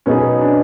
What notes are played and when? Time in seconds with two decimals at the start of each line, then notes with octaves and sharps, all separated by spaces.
0.06 B2 F#3 B3 C#4 D#4 G#4
0.41 D4